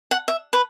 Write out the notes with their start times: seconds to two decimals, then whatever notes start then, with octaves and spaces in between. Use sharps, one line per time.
0.11 F#5
0.28 E5
0.53 B4